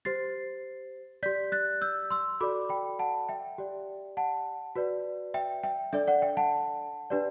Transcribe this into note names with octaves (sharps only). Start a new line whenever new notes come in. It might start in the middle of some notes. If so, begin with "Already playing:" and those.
G4 C5 A6 C7
G4 D5 G6 B6
F#6 A6
E6 G6
C6 E6
F#4 A4 D5 B5 D6
G5 B5
F#5 A5
E5 G5
G4 D5
F#5 A5
F#4 B4 D5
E5 G5
E5 G5
D4 A4 D5 E5
D5 F#5
E5 G5
F#5 A5
D4 G4 B4 D5